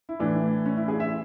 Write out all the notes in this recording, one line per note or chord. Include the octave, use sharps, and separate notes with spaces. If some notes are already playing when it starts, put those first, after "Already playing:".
E4
A2 E3 D4
C#4
E4
G#4
E5